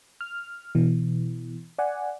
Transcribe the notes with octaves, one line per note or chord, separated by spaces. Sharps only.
F6
B2 E3
D5 F#5 G#5